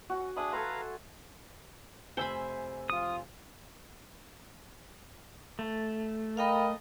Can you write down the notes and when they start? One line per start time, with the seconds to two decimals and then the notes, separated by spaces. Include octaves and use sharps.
0.10 C#4 F#4
0.36 D4 G#4 E5 B5 D#6
0.53 A4 B4 F5 G#5 A#5 C6
2.17 F1 C5 E5 G#5 B5 E6
2.90 F3 F4 D#6
5.59 A3
6.37 A#4 D#5 F5 G5 B5